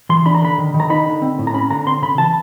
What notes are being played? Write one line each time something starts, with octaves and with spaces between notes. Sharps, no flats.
E3 C6
D4 B5
A#5
D3 B5
D#3
D#3
A#5
D#4 B5
D3
C4
A2
A#5
C#4 B5
D3 A#5
C4 C6
C#3 B5
E3 A5